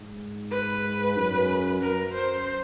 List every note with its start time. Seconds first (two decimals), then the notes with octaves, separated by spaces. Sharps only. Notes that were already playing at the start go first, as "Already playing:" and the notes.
Already playing: G#2
0.51 B4
1.17 F#2
1.81 F#2 A#4
2.14 C5